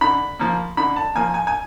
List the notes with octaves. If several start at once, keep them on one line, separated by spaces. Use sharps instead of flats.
D3 B5
F3 A#3
D3 B5
A5
F3 A#3 G#5
G#5
G#5